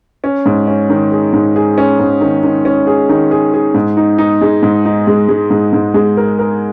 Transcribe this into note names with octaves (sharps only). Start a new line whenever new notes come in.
C#4
G#2
C#4
D#3
G#4
G#2
G#4
C#4
G#2
D#3
D#3
C#4
G#4
D#3
G#4
G#4
G#2
D#4
D#4
G#3
G#2
D#4
G#3
G#3
G#2
G#2
G#3
A#4
A#4